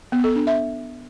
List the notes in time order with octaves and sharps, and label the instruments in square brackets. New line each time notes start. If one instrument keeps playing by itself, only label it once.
[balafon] B3
A4
D4
E5